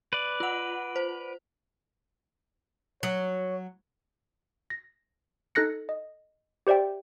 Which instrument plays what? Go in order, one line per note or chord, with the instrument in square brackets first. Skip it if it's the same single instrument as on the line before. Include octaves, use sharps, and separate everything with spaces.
[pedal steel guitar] B4 D5
[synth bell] F4 F#5
C5
[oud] F#3 [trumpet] C#5
[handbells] A#6
D#4 A4 F#6 A#6 C#7
D#5
G4 C5 D5 E5 G5